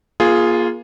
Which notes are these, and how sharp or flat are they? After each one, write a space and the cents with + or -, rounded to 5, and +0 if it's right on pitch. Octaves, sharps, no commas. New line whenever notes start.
A#3 +35 F4 -5 G#4 +0